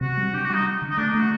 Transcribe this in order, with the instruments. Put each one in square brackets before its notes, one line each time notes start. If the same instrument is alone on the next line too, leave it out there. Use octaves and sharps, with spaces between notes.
[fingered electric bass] C3 [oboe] F#4
[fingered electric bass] G3
[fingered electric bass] D4 [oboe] G4
[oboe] F#4
[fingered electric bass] G3 [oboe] D#4
[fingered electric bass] D4
D3
[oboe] D#4
[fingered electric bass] A3 [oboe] D4
[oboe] D#4
[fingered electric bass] A3 [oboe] F#4